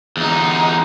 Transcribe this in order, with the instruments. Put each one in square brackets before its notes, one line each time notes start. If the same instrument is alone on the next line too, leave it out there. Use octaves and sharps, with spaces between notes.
[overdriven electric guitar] E2 D#4